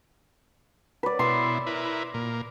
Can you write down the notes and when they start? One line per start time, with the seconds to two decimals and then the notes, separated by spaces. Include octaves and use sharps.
1.03 B4 D5
1.19 B2 E4 C6
1.67 E4 A#4 B4
2.14 A#2 A#4